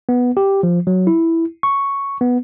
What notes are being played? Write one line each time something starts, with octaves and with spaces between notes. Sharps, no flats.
B3
G4
F3
F#3
E4
C#6
B3